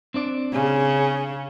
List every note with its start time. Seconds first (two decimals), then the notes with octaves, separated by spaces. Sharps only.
0.14 C4 D4 D5
0.53 C#3